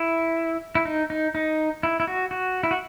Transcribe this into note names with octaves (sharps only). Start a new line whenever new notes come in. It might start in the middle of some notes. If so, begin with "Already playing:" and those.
Already playing: E4
E4
D#4
D#4
D#4
E4
E4
F#4
F#4
E4
F#4